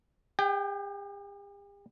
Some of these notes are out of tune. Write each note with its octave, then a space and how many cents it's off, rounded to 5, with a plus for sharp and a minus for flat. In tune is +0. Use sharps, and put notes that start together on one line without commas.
G4 +45 G5 -15